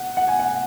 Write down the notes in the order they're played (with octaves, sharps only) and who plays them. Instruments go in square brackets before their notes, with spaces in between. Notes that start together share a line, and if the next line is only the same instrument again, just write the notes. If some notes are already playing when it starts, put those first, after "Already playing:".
Already playing: [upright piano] F#5
F#5
G#5
F#5